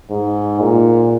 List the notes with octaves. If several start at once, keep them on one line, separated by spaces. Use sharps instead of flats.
G#2
A#2